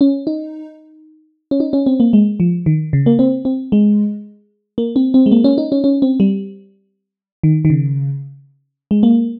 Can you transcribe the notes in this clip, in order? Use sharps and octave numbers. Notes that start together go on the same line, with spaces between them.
C#4
D#4
C#4
D#4
C#4
C4
A#3
G#3
F3
D#3
C#3
A#3
C4
C4
G#3
A#3
C4
C4
G#3
A#3
C#4
D#4
C#4
C#4
C4
G3
D#3
D#3
C#3
G#3
A#3